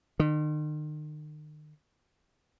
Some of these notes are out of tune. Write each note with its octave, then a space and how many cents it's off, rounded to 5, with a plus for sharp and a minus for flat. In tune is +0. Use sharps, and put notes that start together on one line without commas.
D#3 -40